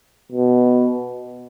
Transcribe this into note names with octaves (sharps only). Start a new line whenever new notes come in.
B2